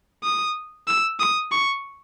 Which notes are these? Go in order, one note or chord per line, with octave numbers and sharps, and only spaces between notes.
D#6
E6
D#6
C#6